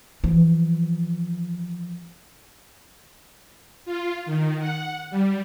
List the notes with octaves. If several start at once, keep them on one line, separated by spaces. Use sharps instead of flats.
E3 F3
F4
D#3
F#5
G3